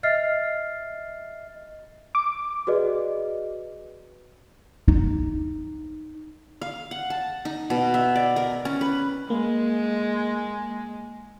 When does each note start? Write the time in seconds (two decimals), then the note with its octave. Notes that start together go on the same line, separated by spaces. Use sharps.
0.03 D#5 E5 F6 A6 C7
2.15 D6
2.67 F#4 G#4 B4 D5 D#5
4.88 D#4
6.61 F5
6.91 F#5
7.10 A5
7.45 D#4
7.70 B2
7.94 E5
8.16 D5
8.36 A#4
8.65 C#4
8.81 B4
9.30 G#3 A#3